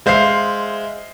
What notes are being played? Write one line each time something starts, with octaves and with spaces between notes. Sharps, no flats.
G#3 C5 E5 F5 C7